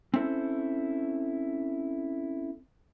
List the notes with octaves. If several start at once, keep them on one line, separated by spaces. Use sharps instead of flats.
C4 C#4 E4 A4 C5